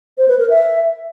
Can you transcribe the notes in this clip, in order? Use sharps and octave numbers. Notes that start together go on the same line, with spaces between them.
C5
B4
A#4
E5